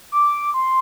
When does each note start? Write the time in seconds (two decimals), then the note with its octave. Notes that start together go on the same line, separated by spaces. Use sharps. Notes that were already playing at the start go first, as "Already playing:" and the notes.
0.12 D6
0.54 C6